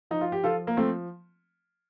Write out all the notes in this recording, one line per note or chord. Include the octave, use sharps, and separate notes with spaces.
F3 D#4
F4
G4
F3 F4 A4
A#3
F3 A3 C4